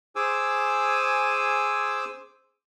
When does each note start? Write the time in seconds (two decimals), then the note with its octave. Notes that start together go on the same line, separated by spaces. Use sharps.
0.16 G#4 C5 G#5 D6 E6